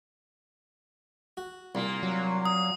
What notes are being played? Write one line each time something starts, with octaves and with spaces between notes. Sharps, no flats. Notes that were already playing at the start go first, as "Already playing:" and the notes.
F#4
C2 A#2 A#3
F#3
D#6